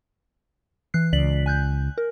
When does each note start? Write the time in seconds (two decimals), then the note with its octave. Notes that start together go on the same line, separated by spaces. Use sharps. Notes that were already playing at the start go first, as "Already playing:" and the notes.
0.94 E3 F#6 C7
1.13 C#2 D5 B6 F#7
1.46 G#5 F#6 G6
1.98 A#4